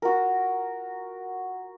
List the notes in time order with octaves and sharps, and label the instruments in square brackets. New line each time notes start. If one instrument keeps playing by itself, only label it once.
[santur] F#4 A#4